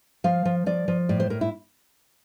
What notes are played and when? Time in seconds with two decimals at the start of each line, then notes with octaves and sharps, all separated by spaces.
0.24 F3 F5
0.45 F3
0.66 F3 D5
0.88 F3
1.09 A2 D5
1.20 C5
1.30 A2 A#4
1.41 E4